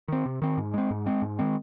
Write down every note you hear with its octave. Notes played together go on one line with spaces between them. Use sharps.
D#3 C4
C3
D#3 C4
G#2
G#3 C4
G#2
G#3 C4
G#2
D#3 G#3 C4